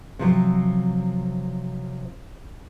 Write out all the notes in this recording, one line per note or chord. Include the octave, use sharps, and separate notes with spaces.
C3 F3 F#3